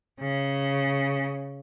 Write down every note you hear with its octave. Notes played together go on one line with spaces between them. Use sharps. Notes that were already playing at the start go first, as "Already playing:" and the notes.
C#3